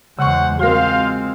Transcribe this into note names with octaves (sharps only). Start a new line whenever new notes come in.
E2 C#3 G#3 C5 F#5 C#6
G#3 C4 F4 F#4 A#4 C5 F5